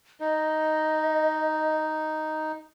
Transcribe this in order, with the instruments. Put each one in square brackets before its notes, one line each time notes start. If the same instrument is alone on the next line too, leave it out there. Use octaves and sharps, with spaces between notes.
[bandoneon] D#4 [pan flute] D#5